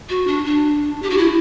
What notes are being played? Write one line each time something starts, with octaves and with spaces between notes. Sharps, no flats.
F#4
D4
D4
G4
F#4
E4